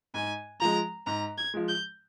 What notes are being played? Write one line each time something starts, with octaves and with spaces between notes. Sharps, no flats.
G#2 G#5
F3 G#3 A#5
G#2 A#5
G#6
F3 G#3
G6